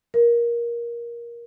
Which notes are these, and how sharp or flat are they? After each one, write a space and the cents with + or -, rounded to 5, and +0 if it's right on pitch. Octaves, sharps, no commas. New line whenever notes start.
A#4 +15